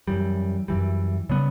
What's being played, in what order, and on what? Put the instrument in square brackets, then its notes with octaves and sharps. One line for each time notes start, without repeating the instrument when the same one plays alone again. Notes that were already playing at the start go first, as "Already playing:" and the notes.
[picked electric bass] F#2 E3 G3
F#2 E3 G3
C#3 G3 B3